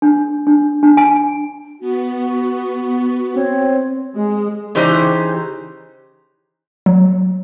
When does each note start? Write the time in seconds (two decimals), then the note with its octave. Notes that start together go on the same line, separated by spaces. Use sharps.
0.02 D4
0.47 D4
0.83 D4
0.97 G#5
1.80 B3 F#4
3.36 C4 C#5
4.13 G#3
4.75 C#3 E3 D#4 G4 C5
6.86 F#3